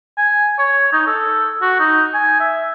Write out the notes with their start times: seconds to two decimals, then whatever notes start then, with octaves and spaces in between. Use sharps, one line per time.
0.17 G#5
0.58 C#5
0.93 D#4
1.07 A4
1.62 F#4
1.80 D#4
2.14 G#5
2.40 E5